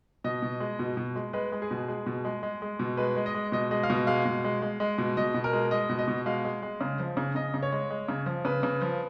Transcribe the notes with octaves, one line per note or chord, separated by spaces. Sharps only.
B2 D#5
B2
G#3
B2
B2
G#3
G#3 B4
G#3
G#4
B2
G#3
B2
G#3
G#3
G#3
B2
G#3 B4
G#3
D#5
G#3
B2 D#5
G#3 D#5
F5
B2 D#5
G#3 F5
B2
G#3
G#3
G#3
B2
B2 D#5
B2
A#4
G#3
G#3 D#5
B2
D#5
B2
G#3 F5
G#3
G#3
C#3
F3
C#3
C#3 D#5
C#3
C#5
G#3
G#3
C#3
F3
C#3 B4
C#3
F3